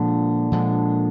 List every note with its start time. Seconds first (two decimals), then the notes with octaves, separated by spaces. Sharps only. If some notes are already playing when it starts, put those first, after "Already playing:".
Already playing: A#2 D3 F3 G#3
0.52 A#2 D3 F3 G#3